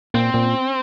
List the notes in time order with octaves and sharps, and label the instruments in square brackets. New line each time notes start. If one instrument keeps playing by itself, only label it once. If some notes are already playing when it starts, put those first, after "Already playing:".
[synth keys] A#2 [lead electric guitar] C4
[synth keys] A#2